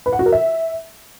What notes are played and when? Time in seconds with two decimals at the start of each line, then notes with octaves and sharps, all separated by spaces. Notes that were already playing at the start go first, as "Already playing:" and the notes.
0.06 B4
0.13 F#5
0.19 F#4
0.26 A#4
0.32 E5